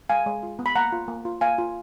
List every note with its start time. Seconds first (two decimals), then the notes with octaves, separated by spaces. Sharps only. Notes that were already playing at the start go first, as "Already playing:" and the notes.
0.09 G#3 F5 G#5
0.26 G#3
0.43 F4
0.59 B3
0.66 B5
0.76 A#3 F#5 A#5
0.92 F4
1.08 A#3
1.25 F4
1.41 A#3 F5 G#5
1.58 F4